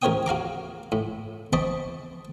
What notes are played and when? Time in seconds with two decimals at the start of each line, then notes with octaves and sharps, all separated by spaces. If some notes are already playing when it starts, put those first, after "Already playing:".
0.02 A1 A#4 C5 C#5 G5 D#6
0.26 F#4 F5 A#5 D6
0.92 A2
1.53 C5 D#5 A5 B5 C#6 D6